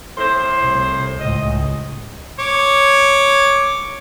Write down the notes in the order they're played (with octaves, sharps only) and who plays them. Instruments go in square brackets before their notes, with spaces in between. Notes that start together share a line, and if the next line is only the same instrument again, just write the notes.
[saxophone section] A2 C5
[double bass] C2
[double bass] C#2 A2 [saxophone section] D#5
[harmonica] C#5 D6